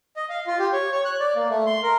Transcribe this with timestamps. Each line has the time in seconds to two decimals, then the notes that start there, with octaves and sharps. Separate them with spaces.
0.16 D#5
0.29 F5
0.47 F4
0.59 G4
0.73 C#5
0.92 C#5
1.05 F#6
1.20 D5
1.36 A#3
1.49 A3
1.66 C6
1.83 A#4